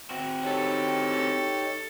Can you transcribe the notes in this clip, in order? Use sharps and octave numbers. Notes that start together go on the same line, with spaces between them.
C4 F#4
D#4 G4 A4 C#5